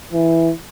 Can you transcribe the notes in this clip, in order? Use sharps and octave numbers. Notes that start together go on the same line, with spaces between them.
E3